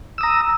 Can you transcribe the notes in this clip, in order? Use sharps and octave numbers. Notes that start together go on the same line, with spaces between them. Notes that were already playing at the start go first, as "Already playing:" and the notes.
A#5 D#6 E6